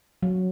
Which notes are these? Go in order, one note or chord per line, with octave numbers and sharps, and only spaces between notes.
F#3